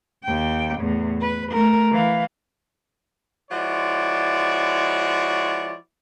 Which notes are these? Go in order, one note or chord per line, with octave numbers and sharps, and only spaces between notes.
D#2 G5
E2 A2
B4
A3 A#4
E3 F5
F3 G#3 E4 F#4 C#5 D5